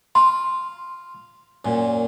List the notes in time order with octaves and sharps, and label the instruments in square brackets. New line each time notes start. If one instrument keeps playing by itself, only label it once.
[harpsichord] F4 [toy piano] C6
[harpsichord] F#2 A#2